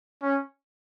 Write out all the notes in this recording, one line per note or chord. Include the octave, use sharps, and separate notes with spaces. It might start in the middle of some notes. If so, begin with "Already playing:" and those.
C#4